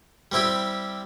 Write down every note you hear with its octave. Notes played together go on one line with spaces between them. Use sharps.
G3 C4 E4 G4